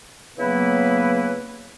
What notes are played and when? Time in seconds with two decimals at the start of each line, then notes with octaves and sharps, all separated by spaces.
0.37 C#3 F#3 A#3 B3 E4 B4